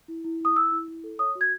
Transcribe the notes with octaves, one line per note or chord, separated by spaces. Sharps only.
E4
E4
E4 D#6
E4 E6
E4
E4
A4
C#5 D#6
F#4
G#6